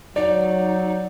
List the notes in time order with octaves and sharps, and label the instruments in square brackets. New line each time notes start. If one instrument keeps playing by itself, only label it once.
[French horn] F#3 [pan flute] D#4 [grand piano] D5